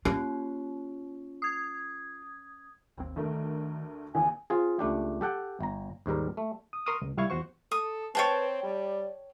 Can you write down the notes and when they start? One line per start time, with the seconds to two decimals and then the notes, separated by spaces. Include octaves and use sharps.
0.05 A#3 C#4 F4
1.42 D#6 G#6
2.97 G#1 D#2 C4
3.16 D2 D#3 A3 A#4
4.15 G#1 D#2 D3 G#5
4.50 C4 F4 G#4
4.79 C#2 A3 D4 G4
5.21 G4 A4 F#5 G5
5.60 G1 A#5
6.06 D#2 G#2 G3 A#4
6.37 A3
6.73 D#6
6.86 A#4 C6 C#6 D#6 F6
7.02 C#2
7.17 C2 G3 E4 F5 C#6 G#6
7.30 E2 F#4 C5 C#6
7.71 A4 D#6
8.15 C4 B4 C#5 G5 A5
8.63 G3 D5